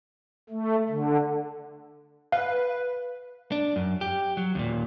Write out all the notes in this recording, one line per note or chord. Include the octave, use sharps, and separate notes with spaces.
A3
D3
B4 F5
D4
F#2
G4
F#3
D#2 A#2